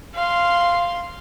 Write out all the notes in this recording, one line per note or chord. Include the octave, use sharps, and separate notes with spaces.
F5 C6